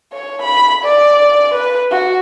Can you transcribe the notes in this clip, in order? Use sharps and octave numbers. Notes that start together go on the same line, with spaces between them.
C#5
B5
D5
B4
F#4